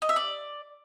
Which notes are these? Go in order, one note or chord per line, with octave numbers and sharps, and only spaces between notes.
D#5
E5
D5